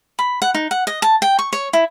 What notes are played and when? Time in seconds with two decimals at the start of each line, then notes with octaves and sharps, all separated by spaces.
0.19 B5
0.42 F#5
0.54 D#4
0.71 F#5
0.87 D#5
1.02 A5
1.22 G5
1.39 C#6
1.53 C#5
1.73 E4